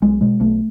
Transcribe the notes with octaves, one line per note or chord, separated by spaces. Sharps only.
B1 G#3
B2 G#3
B1 A3